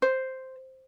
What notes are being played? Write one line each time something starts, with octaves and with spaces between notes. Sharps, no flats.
C5